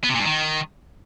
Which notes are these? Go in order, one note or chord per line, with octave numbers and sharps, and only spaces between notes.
B3
C3
A#2
G2
D#3